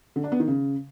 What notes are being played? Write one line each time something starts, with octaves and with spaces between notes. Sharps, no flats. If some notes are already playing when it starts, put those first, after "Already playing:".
D3
D4
B3
D#3
C#3